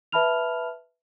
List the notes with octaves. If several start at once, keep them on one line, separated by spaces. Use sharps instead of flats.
B4 E5 A5 B5 F6 F7